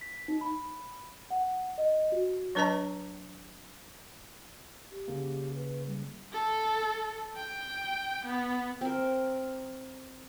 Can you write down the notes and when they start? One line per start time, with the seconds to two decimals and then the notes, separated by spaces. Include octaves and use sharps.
0.01 B6
0.28 D#4
0.41 B5
1.30 F#5
1.78 D#5
2.12 F#4
2.55 F#3 D4 B4 D#5 A5 A#5
4.90 G4
5.08 C#3 A#3
5.55 B4
5.87 G3
6.33 A4
7.37 G5
8.26 B3
8.81 C4 A#4